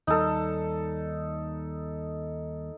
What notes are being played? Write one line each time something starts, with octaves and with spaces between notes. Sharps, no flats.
D#2 G3 D#4 A4